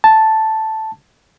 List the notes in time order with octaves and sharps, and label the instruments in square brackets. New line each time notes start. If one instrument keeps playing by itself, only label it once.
[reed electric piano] A5